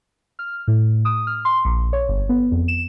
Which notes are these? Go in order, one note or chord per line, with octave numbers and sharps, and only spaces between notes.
F6
A2
D#6
F6
C6
A#1
C#5
G1
B3
F2
E7